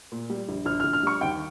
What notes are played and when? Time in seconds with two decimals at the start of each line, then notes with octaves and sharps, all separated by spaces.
0.12 A#2
0.30 G3
0.48 A#1
0.66 A#1 F6
0.80 F6
0.84 A#1
0.93 F6
1.03 G3 C#6
1.21 D#2 G5